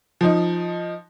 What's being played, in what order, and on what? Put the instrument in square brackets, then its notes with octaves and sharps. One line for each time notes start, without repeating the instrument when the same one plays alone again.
[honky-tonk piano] F3 D#4